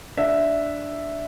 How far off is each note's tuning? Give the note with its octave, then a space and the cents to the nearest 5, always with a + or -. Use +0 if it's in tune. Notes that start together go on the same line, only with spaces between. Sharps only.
D4 +0 E5 +0